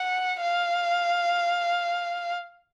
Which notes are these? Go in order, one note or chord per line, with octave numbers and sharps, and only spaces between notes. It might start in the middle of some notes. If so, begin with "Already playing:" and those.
Already playing: F#5
F5